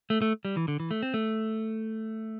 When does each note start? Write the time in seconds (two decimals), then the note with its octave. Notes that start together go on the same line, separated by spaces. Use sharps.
0.10 A3
0.22 A3
0.45 G3
0.57 E3
0.68 D3
0.80 E3
0.91 A3
1.03 C4
1.14 A3